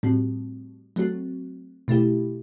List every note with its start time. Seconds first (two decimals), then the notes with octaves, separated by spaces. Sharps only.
0.03 A2 G3 C4 F#4
0.96 F#3 A3 C4 F#4
1.88 B2 A3 E4 G4